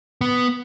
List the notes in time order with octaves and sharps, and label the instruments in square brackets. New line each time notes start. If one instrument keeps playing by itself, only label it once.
[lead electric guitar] B3